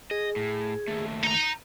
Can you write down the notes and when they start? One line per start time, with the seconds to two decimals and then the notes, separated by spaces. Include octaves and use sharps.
0.11 G#4 D#5
0.36 A2
0.88 D#2 A3
1.23 D#4 A#5